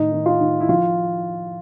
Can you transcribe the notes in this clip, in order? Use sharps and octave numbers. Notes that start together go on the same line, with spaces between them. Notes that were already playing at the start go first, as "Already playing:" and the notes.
Already playing: A2 D#3 D#4
D#3
F4
D#3
E4
F3 F4